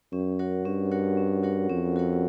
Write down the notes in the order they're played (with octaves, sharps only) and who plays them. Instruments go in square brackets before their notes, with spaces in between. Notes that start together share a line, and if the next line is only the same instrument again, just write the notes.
[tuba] F#2 [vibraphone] C#4
[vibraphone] F#4 A#4 C#5 F#5
[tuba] G2 [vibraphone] C#4
[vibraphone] F#4 A#4 C#5 F#5
C#4
F#4 A#4 C#5 F#5
[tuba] F2 [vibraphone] C#4
[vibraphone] F#4 A#4 C#5 F#5